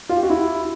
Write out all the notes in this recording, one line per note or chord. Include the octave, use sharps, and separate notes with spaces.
F4
G4
F#4
E4